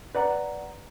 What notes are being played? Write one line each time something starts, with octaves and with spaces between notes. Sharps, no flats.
B4 D5 F#5 A#5